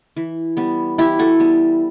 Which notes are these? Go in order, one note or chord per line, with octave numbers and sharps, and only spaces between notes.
E3
G3 B3
E3 E4 G4
F#4 A4
G3 B3